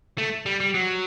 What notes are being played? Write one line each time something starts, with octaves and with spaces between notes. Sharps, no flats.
A3
G3
G3
F#3